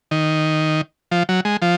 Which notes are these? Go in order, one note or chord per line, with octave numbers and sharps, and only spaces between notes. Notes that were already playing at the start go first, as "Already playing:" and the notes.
D#3
F3
F#3
G#3
F3